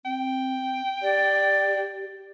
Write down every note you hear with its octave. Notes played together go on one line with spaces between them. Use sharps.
C4 G5
G4 D5